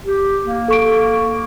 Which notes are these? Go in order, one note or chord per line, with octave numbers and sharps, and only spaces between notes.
G4
A#3
A4 C#6 D7